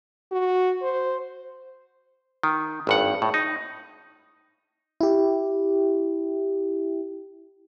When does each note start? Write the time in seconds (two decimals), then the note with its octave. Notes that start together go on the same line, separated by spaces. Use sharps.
0.32 F#4
0.82 C5
2.43 D#3
2.87 G#1 G2 F#5
3.22 A2
3.34 D#4
5.01 E4 G4